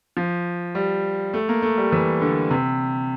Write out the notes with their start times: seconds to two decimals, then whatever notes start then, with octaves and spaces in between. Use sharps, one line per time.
0.17 F3
0.75 G3
1.33 A3
1.49 A#3
1.62 A3
1.77 G3
1.92 E3
2.21 D3
2.50 C3